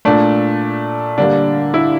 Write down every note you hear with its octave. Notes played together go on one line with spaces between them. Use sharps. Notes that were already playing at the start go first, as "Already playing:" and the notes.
A#2 A3 D4
D3 G3 A#3 D4
E4